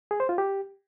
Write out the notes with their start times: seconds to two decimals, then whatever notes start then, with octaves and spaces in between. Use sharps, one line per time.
0.11 G#4
0.20 C5
0.29 F4
0.38 G4